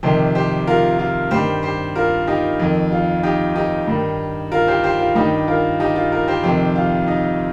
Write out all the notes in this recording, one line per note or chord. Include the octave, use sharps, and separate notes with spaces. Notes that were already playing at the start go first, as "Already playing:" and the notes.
F2 C3 D#3 G4 C5
G4 C5
F4 A#4
F4
G2 D#3 G4 C5
G4 C5
F4 A#4
D#4 G4
F2 D#3
F4
D#4 G4
D#4 G4
G2 D#3
F4 A#4
G4 C5
G4 C5
F4
G2 D#3 D#4 G4
F4 A#4
D#4 G4
F4
F4 A#4
G4 C5
F2 C3 D#3 G4 C5
F4
D#4